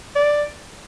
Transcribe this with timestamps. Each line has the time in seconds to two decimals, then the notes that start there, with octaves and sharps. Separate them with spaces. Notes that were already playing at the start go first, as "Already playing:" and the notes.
0.16 D5